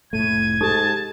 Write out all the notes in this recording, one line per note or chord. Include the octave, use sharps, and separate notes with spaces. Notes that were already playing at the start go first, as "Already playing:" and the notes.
F1 A2 A3 G#6 D#7
G#2 D#4 G4 A4 A5